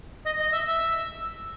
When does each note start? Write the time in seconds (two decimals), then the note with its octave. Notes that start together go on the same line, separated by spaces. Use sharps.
0.26 D#5
0.40 D#5
0.53 E5
0.67 E5